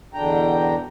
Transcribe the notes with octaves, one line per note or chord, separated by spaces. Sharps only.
E2 B2 D3 D4 G5 A#5